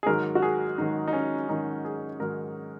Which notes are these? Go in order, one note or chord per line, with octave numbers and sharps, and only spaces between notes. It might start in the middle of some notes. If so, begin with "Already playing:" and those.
G#4
G#2 D#3 F#3 A#4
F#4
G#4
G#2 D#3 F#3 D#4
D#4
C#4
G#2 D#3 F#3 D#4
G#4
G#2 D#3 F#3 A#4